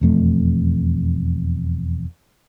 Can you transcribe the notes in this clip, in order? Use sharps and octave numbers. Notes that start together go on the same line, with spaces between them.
E1 F2 A3